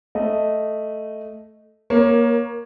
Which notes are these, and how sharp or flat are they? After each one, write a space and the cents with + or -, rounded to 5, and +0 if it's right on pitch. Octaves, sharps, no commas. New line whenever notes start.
A3 +0 D#5 +0
A#3 +20 A#4 +0 C#5 +0